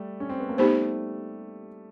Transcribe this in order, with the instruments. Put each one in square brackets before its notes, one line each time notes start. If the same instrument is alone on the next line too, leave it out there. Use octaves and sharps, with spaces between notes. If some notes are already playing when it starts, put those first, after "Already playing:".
Already playing: [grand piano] G3 A3
C#4
C4
B3
A#3
[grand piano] G3 A3 [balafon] B3 D#4 G4 C5